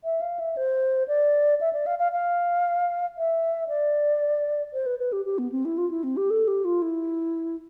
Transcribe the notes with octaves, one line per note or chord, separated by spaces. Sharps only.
E5
F5
E5
C5
D5
E5
D5
F5
F5
F5
E5
D5
C5
B4
B4
G4
G4
B3
C4
E4
F4
E4
C4
G4
A4
G4
F4
E4